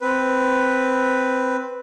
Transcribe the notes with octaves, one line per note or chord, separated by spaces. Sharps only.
C4 B4